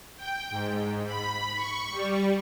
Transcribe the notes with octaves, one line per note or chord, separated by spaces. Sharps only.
G5
G#2
B5
C#6
G3